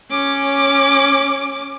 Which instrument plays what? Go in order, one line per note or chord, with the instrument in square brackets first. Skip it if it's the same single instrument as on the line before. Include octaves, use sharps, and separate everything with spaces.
[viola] C#4 D6